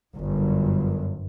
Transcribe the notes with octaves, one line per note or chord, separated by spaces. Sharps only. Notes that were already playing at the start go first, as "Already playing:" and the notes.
G1 F#2